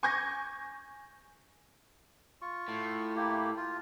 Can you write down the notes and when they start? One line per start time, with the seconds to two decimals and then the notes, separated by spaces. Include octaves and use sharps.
0.03 G#5 C#6 D6 G6 G#6 A#6
2.42 F4 C#6
2.68 A2
3.16 A#3 E4 G4
3.57 F4